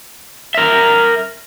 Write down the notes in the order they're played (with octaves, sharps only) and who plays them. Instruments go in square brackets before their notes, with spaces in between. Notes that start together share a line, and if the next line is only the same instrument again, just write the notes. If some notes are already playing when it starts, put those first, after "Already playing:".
[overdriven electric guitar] A#4 E5